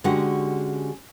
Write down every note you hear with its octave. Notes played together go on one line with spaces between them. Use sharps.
D3 G#3 C#4 F#4 G4 F#5